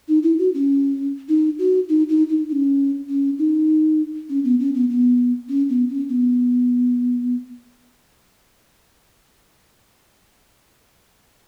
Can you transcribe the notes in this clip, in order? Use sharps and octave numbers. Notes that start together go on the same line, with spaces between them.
D#4
E4
F#4
C#4
D#4
F#4
D#4
D#4
D#4
D#4
C#4
C#4
D#4
C#4
B3
C#4
B3
B3
C#4
B3
C#4
B3